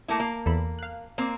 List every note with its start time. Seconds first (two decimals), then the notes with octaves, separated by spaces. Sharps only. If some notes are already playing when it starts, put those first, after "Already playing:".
0.08 A3 A#3 E4
0.20 A#3
0.46 E2 A4 B5
0.79 F5 F#6
1.18 A#3 C4